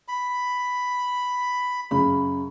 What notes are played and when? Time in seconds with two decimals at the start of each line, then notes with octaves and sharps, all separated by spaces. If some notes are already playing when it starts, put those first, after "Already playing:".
0.08 B5
1.91 F#2 C#3 B5